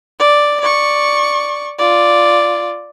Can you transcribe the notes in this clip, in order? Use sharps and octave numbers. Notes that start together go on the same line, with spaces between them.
D5
D5 C#6
F4 D5